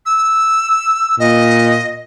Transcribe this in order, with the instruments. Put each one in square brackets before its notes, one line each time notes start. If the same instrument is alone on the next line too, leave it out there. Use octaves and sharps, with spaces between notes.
[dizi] E6
[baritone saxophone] A#2 [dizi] D#5